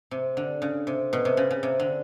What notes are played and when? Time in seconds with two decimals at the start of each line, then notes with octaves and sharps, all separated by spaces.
0.11 C3
0.37 D3
0.62 C#3
0.87 C3
1.13 B2
1.25 C3
1.37 C#3
1.51 C#3
1.63 C3
1.80 D3